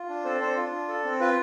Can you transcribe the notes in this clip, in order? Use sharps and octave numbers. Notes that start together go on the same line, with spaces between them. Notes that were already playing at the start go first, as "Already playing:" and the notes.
Already playing: F4
D4
C4 A4 C5
C4 D4 C5
F4
D4
A4
C4
F4 B4